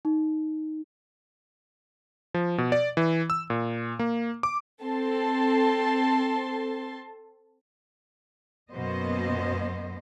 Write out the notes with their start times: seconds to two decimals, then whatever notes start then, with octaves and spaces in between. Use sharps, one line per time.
0.05 D#4
2.34 F3
2.58 B2
2.72 D5
2.97 E3
3.30 E6
3.50 A#2
3.99 A#3
4.43 D6
4.82 C4 A4 A5 C6
8.72 F#2 B2 A#3 B3 C5 D#5